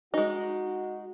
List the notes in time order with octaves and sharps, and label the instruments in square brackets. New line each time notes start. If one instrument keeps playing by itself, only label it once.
[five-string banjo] G#3 D#4 [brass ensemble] F#4